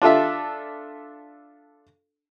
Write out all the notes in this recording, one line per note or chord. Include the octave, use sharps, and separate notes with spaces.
D4 F4 A4 E5